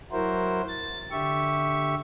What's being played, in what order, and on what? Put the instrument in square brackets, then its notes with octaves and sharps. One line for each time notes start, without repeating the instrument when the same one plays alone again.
[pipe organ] F#3 E4 F#4 A#4 C5
A6
D3 G4 E5 C#6